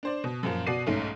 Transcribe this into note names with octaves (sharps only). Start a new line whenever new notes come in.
D4 C5 D5
B2
F#2 A#2 F3
B2 F#4 D5 C7 D#7
B1 G#2 A3 C#4